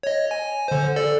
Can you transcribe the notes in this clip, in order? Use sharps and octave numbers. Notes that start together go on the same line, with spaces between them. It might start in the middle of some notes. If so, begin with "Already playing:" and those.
C#5 D#5
G#5
D3 C5
A4 D5